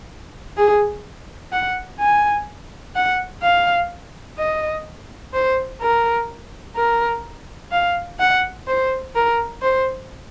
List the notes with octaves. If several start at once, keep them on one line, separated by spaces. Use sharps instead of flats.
G#4
F#5
G#5
F#5
F5
D#5
C5
A#4
A#4
F5
F#5
C5
A#4
C5